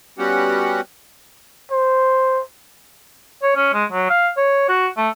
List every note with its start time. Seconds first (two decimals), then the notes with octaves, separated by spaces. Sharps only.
0.18 G3 B3 C#4 F#4 G4 F#5
1.71 C5
3.43 C#5
3.56 C#4
3.73 G#3
3.92 F#3
4.10 F5
4.37 C#5
4.69 F#4
4.97 A3